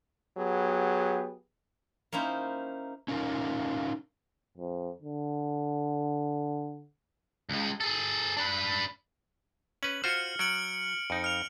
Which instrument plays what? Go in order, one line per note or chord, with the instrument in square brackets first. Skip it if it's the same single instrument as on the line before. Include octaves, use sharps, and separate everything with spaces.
[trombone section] F#3 B3 G4 G#4
[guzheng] A#3 C#4 D#4 E4 C5
[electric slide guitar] C#4 D#4 F4 A#4
[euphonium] F2
D3
[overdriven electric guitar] C#2 G#3
G#4 A4
D4 B4
[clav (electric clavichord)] C#4 B4 [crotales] F#7
[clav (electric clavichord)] F4 F#4 C5 [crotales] F6 C#7
[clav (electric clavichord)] F#3 [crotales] C#7 D7 F#7
[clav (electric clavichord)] F2 D#4
[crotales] F6 F7